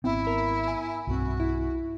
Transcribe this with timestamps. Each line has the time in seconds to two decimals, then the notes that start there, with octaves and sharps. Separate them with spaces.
0.04 G#1 B3 C4 E4
0.27 A#4
0.68 G#5
1.07 B1 G2 C4 F#4
1.40 E4